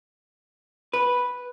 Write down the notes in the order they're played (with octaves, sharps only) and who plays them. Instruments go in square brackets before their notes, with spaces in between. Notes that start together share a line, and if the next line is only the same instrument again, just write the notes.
[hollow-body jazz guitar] B4